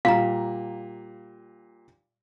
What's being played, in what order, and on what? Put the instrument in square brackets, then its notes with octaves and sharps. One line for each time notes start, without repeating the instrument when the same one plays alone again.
[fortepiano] A#2 G3 [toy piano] F5 A#5